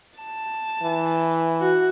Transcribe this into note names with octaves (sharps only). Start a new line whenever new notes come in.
A5
E3
F#4